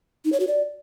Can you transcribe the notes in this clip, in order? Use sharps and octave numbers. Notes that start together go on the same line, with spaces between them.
D#4
C#5
F#4
D5